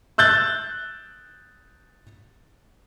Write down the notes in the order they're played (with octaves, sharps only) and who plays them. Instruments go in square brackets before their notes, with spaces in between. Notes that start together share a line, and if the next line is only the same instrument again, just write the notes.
[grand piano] E6 F#6 G6 A6